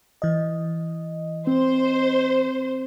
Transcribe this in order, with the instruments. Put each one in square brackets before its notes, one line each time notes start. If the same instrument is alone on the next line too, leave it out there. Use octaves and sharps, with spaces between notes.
[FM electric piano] E3 D#5
[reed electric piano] C4 [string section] C5